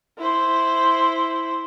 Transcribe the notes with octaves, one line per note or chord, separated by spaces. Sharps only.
E4 C5